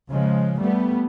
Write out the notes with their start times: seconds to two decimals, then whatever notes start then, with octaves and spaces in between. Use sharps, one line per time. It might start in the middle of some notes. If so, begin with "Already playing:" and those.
0.10 C#3 F3 G#3
0.59 G3 A3 B3